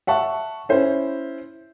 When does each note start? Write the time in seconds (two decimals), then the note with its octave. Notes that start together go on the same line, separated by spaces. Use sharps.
0.07 E5 F#5 A5 C#6
0.69 C#4 E4 C5